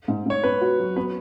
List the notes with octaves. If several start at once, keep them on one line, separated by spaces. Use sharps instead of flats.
G#2
G#2 C#5
B3 B4
F#4
F#3
B3 B4